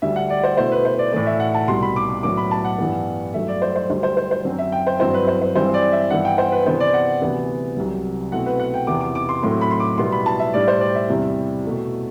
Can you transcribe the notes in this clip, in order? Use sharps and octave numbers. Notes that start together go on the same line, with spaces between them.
D2 D3 G3 E5
F#5
D5
C5
B2 A3 E4 C5
B4
C5
D5
A2 E3 A3 D5
E5
F#5
A5
C2 B2 G3 C6
B5
D6
D6
A2 F#3 B3 D4 D6
B5
A5
F#5
G2 E3 G3 B3
G2 F#3 A3 E5
D5
C5
C5
D2 D3 G3 C5
C5
C5
C5
F#2 F#3 C4
E5
G5
C5
G2 F#3 C4 E4 C5
B4
C5
C5
G2 E3 G3 C4 E4 C5
D5
E5
G2 E3 B3 E4 F#5
G5
C5
B4
C3 E3 B3 D4 C5
D5
F#5
D2 C3 E3 B3 E4
C2 C3 F#3
B2 A3 C4 E4 F#5
B4
F#5
G5
E2 C3 E3 B3 E4 D6
D6
D6
C6
A2 F#3 A3 C4 C6
B5
C6
D6
B2 G3 B3 E4 C6
B5
A5
E5
A2 G3 D4 D5
C5
D5
E5
E2 C3 G3 C4 E4
B2 A3 E4